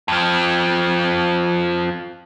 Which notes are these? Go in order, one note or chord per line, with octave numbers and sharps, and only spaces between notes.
F2 F3